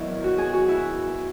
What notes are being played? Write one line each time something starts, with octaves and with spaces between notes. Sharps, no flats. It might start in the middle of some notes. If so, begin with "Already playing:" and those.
Already playing: E2 D#3 F#3 E4
F#4
G#4
F#4
E4